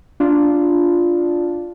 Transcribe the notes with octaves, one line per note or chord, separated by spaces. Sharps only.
D4 F4